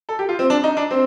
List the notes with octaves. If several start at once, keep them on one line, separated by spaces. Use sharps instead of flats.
A4
G4
F4
C4
D4
D#4
D4
C4